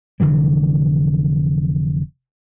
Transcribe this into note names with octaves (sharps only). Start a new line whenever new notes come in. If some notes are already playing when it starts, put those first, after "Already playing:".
F1 D3 E3 G3